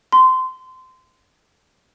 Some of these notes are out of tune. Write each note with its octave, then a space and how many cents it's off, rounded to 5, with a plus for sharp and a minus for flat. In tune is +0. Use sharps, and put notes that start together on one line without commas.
C6 -20